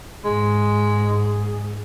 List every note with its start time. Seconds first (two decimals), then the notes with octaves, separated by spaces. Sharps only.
0.25 G#2 G#3 G#4